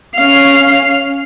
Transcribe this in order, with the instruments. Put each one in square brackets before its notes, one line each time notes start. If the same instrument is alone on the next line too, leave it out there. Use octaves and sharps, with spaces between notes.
[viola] C#4 F5